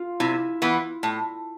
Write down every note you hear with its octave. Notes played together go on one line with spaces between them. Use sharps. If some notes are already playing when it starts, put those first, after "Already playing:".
Already playing: F4
C3 E4
E3 B3
A2